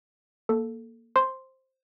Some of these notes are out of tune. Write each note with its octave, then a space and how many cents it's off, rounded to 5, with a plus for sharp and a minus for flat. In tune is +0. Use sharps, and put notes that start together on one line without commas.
A#3 +0 A4 +0
C5 +10 C6 +0